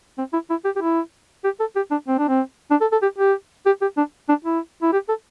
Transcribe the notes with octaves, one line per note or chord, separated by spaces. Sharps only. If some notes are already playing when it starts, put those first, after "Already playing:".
C4
E4
E4
G4
G4
E4
G4
A4
G4
D4
C4
D4
C4
D4
A4
A4
G4
G4
G4
G4
D4
D4
E4
E4
G4
A4